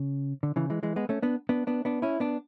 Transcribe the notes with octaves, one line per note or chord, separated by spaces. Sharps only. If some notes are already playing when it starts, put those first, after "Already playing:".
Already playing: C#3
D3
C#3 E3
E3 G#3
E3 G#3
G#3 B3
A3 C#4
B3 D4
B3 D4
B3 D4
B3 D4
C#4 E4
B3 D4